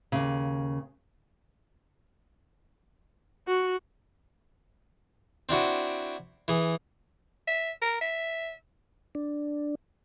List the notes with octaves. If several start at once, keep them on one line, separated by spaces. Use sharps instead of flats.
D#2 C#3
F#4
C4 D4 E4 F#4
E3 G#4
E5
A#4
E5
D4